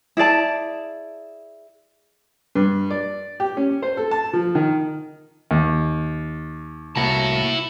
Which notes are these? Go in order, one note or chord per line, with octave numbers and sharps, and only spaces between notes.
E4 G#4 D5 A5
G2
D5
G4
C#4
C5
A4
A5
F3
D#3
D#2
C2 A#3 E4 F#4 A5